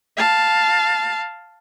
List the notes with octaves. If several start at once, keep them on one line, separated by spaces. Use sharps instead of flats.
F5 A5